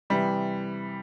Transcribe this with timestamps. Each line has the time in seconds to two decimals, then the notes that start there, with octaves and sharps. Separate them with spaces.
0.10 C3 E3 G3